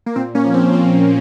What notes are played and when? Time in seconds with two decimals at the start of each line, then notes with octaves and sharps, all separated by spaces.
0.06 A#3
0.16 A#2 C4
0.35 A#3 C#4
0.44 F3
0.54 C4
0.73 A#2 C4
0.92 C4
1.01 F3